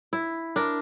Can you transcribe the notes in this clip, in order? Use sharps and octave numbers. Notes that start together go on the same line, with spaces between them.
E4
D4 A#4